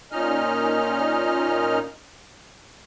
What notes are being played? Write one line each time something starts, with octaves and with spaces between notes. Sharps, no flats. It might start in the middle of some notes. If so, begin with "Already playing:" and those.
A#2 C#4 D#4 D#5 F6